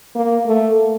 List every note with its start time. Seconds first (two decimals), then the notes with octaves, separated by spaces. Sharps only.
0.15 A#3
0.47 A3